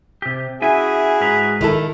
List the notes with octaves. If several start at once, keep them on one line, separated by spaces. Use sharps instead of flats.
C3 G4
C#4 E4 F#4 G#4 E5 G#5
G#2 B4 A#5
D#3 E4 A4